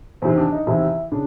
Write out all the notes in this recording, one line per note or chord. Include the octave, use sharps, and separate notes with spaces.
E2 C3 D#3 C4
D4
D#4
E2 C3 D#3 E4
C#3 D4